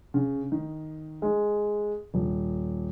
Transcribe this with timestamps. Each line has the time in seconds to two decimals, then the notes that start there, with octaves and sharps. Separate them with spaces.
0.14 C#3
0.52 D#3
1.22 G#3
2.14 D#1